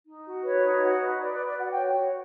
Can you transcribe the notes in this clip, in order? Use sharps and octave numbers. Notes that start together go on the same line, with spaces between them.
D#4
F#4
B4 C#5
D#4
F#4
B4
B4 D5
D5
B4
D5
F#4 F#5
G5
C#5
F#4